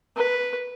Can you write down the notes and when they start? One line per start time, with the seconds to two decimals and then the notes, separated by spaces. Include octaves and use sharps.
0.16 B4